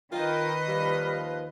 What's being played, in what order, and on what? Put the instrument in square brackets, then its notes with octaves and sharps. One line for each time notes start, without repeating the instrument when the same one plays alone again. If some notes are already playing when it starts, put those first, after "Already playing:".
[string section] D#3 D#5 [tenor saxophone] F4 [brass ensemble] A#4 G5 [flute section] B4
[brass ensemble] D#2 F3 F5 [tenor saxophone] G3